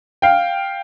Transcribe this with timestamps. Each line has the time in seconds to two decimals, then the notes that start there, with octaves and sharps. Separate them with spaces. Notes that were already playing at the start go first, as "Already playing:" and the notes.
0.22 F5 G5